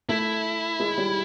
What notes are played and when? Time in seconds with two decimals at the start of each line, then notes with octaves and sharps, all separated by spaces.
0.09 A3 E4
0.80 G#3
0.98 G3